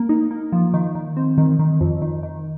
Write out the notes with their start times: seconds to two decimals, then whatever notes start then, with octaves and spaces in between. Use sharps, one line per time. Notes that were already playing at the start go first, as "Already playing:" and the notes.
Already playing: A#3
0.09 D#4
0.31 A#3
0.52 F3
0.74 D#3
0.95 D#3
1.17 C4
1.38 D#3
1.59 D#3
1.81 F2
2.02 D#3
2.23 D#3